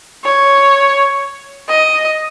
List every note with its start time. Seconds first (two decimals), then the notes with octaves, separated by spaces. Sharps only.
0.24 C#5
1.69 D#5